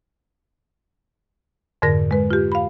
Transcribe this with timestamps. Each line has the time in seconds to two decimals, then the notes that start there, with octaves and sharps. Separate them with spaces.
1.82 F2 G#2 D3 A#4 A#6
2.11 G#3 B4
2.31 F4 G4
2.52 F5 B5